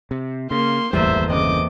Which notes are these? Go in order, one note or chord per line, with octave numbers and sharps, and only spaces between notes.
C3
C#3 A#3 C6
D1 G#1 E2 G3 A3 A#3 C5 E5
G1 C#3 C4 D#5 D6